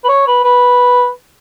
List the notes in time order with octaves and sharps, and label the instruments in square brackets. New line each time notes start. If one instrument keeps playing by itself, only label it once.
[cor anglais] B4
C#5
B4
B4